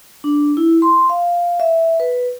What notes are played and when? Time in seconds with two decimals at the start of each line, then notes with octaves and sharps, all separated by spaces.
0.24 D4
0.57 E4
0.82 C6
1.10 F5
1.60 E5
2.00 B4